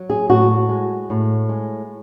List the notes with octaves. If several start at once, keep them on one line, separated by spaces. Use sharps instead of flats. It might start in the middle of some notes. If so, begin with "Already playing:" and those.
Already playing: F#3
G#4
A2 F#4
G#3
A2
G#3